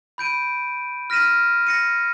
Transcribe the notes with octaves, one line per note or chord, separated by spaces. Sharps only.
B5 G6 D7 D#7
F6 A#6 B6 D#7 E7
A#6 C#7 D#7